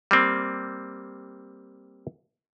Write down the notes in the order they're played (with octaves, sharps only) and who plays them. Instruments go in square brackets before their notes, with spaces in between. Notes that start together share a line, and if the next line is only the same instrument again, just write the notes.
[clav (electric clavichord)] G3 A#3 C4